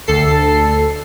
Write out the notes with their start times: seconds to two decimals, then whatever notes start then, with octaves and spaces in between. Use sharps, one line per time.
0.07 D2 A4 C7